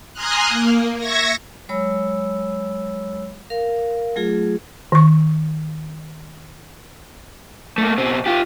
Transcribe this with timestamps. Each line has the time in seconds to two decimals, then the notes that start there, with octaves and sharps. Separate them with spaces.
0.13 G#5 A#5 C6 D#6 F6 F#6
0.49 A#3
0.97 E5 C#6 G#6 A#6
1.69 F#3 G#3 C#5 B5 E6
3.50 A#4 F5
4.16 F#3 A3 F4 G#4
4.92 D#3 C#6
7.78 A3 A#3
7.98 B2 C4
8.26 F4 G4